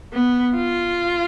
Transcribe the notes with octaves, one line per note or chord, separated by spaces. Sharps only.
B3
F4